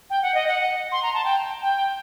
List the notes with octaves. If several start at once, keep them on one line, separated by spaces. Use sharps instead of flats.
G5
F#5
D#5
F#5
C6
A#5
A5
G5
G5